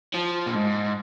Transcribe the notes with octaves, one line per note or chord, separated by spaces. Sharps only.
F3
A#2
G#2